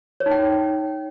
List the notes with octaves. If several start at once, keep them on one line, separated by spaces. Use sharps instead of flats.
C#5
D#4
G5